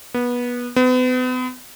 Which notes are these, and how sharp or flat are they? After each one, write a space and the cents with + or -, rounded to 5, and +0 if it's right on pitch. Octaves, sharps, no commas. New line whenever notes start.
B3 -20
B3 +40